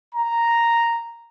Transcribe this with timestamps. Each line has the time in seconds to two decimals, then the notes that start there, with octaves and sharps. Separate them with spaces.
0.15 A#5